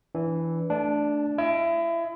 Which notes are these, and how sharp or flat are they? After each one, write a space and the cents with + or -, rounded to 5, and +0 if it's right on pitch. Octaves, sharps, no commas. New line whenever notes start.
E3 +0 D4 -25
A3 +0 D4 +0 A5 -30
E4 +30 D#5 +35